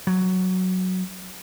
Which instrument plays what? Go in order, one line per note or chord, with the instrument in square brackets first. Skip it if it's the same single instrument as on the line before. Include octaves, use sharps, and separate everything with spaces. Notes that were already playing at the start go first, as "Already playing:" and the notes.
[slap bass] F#3